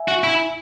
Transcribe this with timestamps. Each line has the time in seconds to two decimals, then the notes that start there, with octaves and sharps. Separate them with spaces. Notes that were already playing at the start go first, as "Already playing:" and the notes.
Already playing: E5 G#5
0.08 F#4
0.24 E4